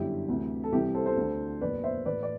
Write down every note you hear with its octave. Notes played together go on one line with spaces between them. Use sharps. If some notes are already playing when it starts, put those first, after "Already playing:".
Already playing: G1 F#2 D3 E4 G4
D2 C3 E3
A4
C2 C3 E3 E4 G4
A4 C5
A4 C5
D2 D3
F#1 E2 B2 B4 D5
C5 E5
A1 A2 E3 B4 D5
D5